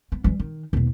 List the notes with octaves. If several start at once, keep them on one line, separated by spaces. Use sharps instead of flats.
B3
E3 G3
D#3
D#2 B2